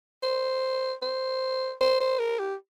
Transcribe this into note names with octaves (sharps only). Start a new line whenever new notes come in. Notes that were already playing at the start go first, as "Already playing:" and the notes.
C5
C5
C5
C5
A#4
G4